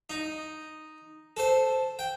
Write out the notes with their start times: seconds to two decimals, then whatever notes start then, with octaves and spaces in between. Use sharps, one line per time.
0.10 D#4
1.37 A4 C5
1.99 G5